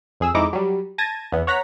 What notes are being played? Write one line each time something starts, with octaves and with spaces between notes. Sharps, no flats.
F2 G#4 E6
F2 G#3 D#4 E4 D6 A#6
F#3 G3
A5 G#6 A#6 D#7
E2 B3
C#5 F#5 A#5 A#6 B6